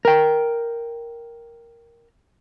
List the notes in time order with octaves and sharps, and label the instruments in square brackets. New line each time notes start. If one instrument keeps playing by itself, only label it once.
[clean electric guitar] A#4 G5